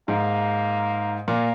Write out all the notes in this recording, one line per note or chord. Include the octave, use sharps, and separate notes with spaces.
G#2 A#3
A#2 A#3